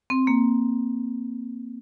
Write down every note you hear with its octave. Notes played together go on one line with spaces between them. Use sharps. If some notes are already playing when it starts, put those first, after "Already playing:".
C4
A#3